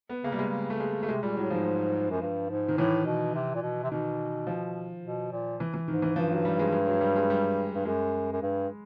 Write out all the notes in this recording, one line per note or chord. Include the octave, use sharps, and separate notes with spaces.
B3
C#3 A#3
G3
C3 G#3
C#3
A3
G#3
C#3 A3
C3 G#3
A#2 G3
A2 F#3
G#2 F3
F#2
G2
G#2
D#3
A2 E3
B2
C3
A#2
B2
C3
B2 D#3
F3
B2
A#2
E3
E3
G#2 D#3
E3
G2 F3
F#3
G3
G#3
G#3
F#3
G3
G#3
G3
G2
F#2 G#3
F#2
G2